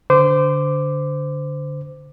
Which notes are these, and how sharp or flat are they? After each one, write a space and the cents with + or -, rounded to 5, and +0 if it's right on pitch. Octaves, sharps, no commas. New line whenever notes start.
D3 -10 C5 -25 D6 +0